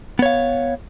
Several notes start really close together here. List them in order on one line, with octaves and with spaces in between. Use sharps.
B3 C#5 F5